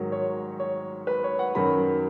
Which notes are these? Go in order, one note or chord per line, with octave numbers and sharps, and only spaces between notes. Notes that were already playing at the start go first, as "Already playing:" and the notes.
Already playing: G#2 D#3 F#3
C#5
C#5
B4
C#5
F#5
F#2 D#3 F#3 B5